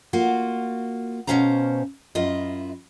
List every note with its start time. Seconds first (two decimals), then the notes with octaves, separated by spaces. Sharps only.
0.13 A#3 F4 F#4
1.27 B2 A3 C#4 C5 F5 A#5
2.15 F#2 E4 F4 D#5